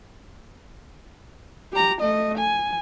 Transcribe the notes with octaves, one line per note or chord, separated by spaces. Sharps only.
G4 A#5
A3 D#5
G#5